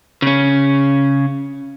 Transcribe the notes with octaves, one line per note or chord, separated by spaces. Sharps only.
C#3 C#4